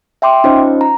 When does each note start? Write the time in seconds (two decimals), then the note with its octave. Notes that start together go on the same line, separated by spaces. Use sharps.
0.22 E5 G5 C6 D6
0.44 C#4 D#4 F4 C5 D#5
0.81 A#5